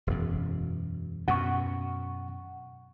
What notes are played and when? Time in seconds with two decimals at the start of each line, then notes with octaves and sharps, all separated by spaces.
0.07 E1 F#2
1.28 F#2 B2 F#5 C#6